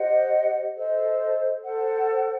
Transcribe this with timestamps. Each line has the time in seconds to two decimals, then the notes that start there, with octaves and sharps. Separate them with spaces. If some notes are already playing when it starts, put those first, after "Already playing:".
Already playing: G4 C5 D#5 F#5
0.76 A4 C5 D#5
1.62 A4 C5 F#5